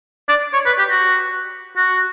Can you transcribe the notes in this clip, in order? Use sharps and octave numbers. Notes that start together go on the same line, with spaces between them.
D5
C#5
B4
G4
F#4
F#4